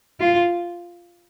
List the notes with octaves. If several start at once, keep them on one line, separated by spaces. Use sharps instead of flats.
F4